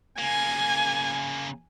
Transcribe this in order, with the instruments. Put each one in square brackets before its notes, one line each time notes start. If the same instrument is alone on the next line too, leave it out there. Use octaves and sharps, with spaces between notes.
[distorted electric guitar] C#3 A#3 [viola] G#5